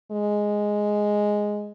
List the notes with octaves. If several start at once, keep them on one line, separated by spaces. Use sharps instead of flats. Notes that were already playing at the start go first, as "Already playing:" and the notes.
G#3